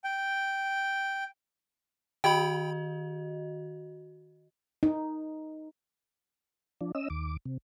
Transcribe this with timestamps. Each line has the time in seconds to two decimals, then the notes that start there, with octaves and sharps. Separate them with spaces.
0.04 G5
2.24 D#3 F#4 D#5 G5 B5
4.83 D#4
6.81 F3 D4
6.95 C#4 D#5 E6
7.10 D#2 D6
7.45 C3